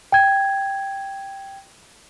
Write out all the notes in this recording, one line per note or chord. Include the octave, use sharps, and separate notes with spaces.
G5 G#6